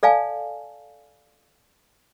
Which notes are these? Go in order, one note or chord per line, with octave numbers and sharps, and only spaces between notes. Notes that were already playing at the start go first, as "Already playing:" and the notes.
A4 D5 F5 G#5 A5